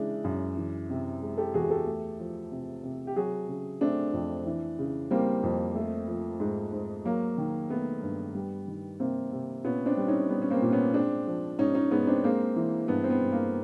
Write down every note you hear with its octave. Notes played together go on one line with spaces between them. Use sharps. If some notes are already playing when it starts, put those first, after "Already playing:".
Already playing: C#3 E3 G#3 D4 E4
F#2
E3
C3
G#3
G4 A4
E2 F#4 G#4
G4 A4
A3
F3
C3
C3
G4
F#3 F#4 G#4
C#3
A3 C4 D4
F2
E3
C#3
G3 A#3 C4
F2
A3
F3
G#2
G#2
F#3 A#3
D#3
A3 B3
G2
G3
D#3
C3 A#3 C4
C3
A#2 B3 C#4
C4 D4
G3
C#4 D#4
G3 B3
C#4
A#3 C4
A#2
B3 C#4
G#3 C4 D4
F3
G#2 C#4 D#4
C#4 D#4
G#2 B3 C#4
C4 D4
G#3 A#3 C4
E3
G2 B3
C4
B3
G2
A#3